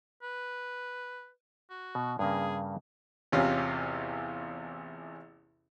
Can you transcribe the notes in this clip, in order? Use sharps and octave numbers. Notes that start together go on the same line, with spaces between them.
B4
F#4
B2
G2 C#3 A#3 G#4
A1 E2 C3 C#4 F4 G4